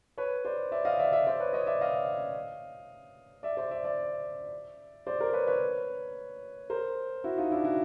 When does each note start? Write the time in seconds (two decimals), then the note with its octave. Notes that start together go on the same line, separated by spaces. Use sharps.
0.18 B4 C#5
0.45 C5 D5
0.72 D5 E5
0.85 D#5 F5
0.99 D5 E5
1.12 D5 E5
1.26 C5 D5
1.40 B4 C#5
1.53 C#5 D#5
1.67 D5 E5
1.81 D#5 F5
3.43 D5 E5
3.57 C5 D5
3.71 D5 E5
3.84 D5 E5
5.07 C5 D5
5.20 A#4 C5
5.33 B4 C#5
5.47 B4 C#5
6.70 A#4 C5
7.24 E4 F#4
7.38 D#4 F4
7.51 D4 E4
7.64 E4 F#4